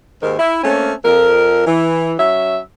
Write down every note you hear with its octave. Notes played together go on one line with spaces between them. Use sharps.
D#2 G#2 D#3 A#4
E4
A3 A#3 C4 C#4
F2 A#4
E3
F#3 C#4 E5